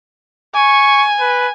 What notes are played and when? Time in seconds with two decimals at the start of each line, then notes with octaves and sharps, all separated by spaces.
0.55 G#5 C#6
1.20 B4